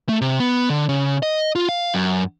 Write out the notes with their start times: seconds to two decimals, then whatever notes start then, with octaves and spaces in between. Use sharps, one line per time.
0.09 A3
0.21 C3
0.40 B3
0.70 D3
0.89 C#3
1.23 D#5
1.55 F4
1.69 F5
1.94 F#2